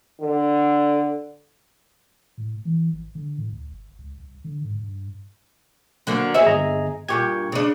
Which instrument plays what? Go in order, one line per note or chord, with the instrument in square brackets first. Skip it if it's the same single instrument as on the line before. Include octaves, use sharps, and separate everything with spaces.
[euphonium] D3
[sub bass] A2
E3
G#1
D3
A2
D2
G1
C#2
C2
D3
G#2
G2
[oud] D3 F#3 A#3
G#4 C#5 E5
[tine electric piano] G1 D#5 A#5
[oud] G2 A#2 G4 [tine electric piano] C#6 G#6
[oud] C#3 D4